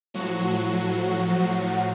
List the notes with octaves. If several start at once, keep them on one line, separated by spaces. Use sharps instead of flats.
A2 F3 F#3 F#4